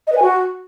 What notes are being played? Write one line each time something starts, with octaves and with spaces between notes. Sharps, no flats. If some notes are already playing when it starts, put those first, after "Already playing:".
D#5
B4
G#5
F#4